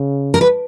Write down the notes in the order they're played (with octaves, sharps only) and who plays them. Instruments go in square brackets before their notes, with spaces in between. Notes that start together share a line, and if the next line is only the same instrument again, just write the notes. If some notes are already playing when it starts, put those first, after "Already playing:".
Already playing: [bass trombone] C#3
[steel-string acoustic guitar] A#4
B4